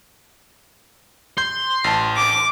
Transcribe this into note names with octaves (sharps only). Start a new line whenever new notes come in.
C6 G6
A1 A5
D6